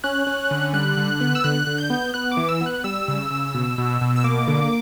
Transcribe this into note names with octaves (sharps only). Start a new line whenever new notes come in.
C#4 F#6
C#4
D3
G3 F#6
D3
B3
E6
D3 F#6
D3
G6
B3
B3 F#6
D6
E3
E6
B3
F#6
G3 E6
C#3
C#3
B2
B2
B2
E6
A#3 D6
D3